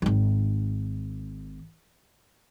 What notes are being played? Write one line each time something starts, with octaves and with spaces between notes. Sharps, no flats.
G#1 D#3